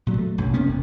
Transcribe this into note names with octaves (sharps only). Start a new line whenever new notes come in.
A#2 F#3 G3
A3
B1 F#2
C3 A#3 B3 C#4
E1